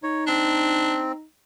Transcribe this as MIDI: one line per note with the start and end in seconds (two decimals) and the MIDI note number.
0.03 1.24 63
0.03 0.24 73
0.27 1.12 60
0.27 1.02 62